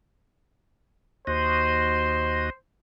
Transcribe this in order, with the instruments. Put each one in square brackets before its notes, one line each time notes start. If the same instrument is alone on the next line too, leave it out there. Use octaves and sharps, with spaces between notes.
[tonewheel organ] D#2 F#4 D#5 [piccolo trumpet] C5